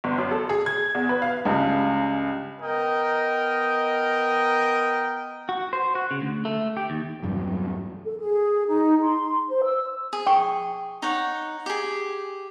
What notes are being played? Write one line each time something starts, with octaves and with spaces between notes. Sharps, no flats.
G1
F#2
A4
G#4
G#6
E2
B4
F5
C#2 G2 C#3
B3 A#4 D#5 G5
F#4
C5
F#4
C#3
D2
A3
G4
D#2
F1 E2 G2 F#3
A4
G#4
D#4
C6
C5
E6
G#4
G5 C#6
D#4 C#5 F#5
G4 G#4